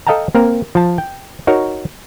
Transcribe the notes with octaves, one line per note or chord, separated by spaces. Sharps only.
A4 D#5 F5 G5 A5 A#5
A#3 C4 A#4
F3 A5
G5
D#4 F#4 A#4 C#5